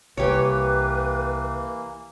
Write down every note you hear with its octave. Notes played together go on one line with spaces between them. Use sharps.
C2 E3 A#3 G4 B4 C#5